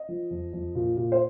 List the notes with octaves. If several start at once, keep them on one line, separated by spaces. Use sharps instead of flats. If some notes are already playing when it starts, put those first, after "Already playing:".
Already playing: D#5
F3
F2
F2
A#2
A#2
C5